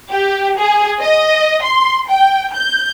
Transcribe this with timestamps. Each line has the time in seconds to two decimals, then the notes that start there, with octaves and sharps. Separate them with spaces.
0.10 G4
0.58 G#4
1.01 D#5
1.62 C6
2.08 G5
2.53 G6